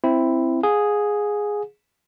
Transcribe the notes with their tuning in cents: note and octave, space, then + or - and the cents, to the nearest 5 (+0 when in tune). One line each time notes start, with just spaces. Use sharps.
C4 +0 E4 +5
G#4 +0 F5 +45